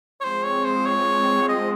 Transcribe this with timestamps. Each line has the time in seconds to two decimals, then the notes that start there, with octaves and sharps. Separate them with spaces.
0.20 C#5
0.24 F3 G#3 C4 C5
0.45 C#5
0.65 C5
0.86 C#5
1.48 D#5